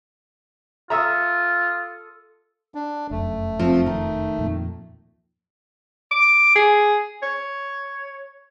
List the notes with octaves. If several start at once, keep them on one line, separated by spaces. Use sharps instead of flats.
F4 A4 E5 A#5 D#6 E6
D4
F1 F#2 A3
F3 C4
D#3
F2 A#2
D6
G#4
C#5